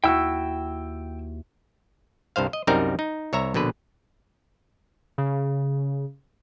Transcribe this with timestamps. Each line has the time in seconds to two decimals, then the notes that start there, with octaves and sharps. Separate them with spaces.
0.04 D#2 E4 F#4 G5 E6
2.36 C2 G2 C5 F5
2.53 D#5
2.67 C2 F#2 G3 C4 D#4 A#4
2.99 D#4
3.33 C2 C#5 E5 A#5
3.54 A#1 B2 D3 B4
5.18 C#3